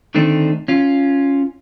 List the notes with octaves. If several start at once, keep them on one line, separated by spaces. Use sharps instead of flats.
D3 D#3 A3 C4 D4 D#4
C#4 F4